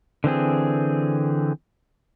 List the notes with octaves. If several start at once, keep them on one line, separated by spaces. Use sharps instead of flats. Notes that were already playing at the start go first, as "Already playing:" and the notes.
D3 E3 C4 G#4